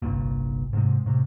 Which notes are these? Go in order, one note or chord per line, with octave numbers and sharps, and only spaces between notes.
G1 C2 G2 A#2
G#2 C3 G#3
A2 C3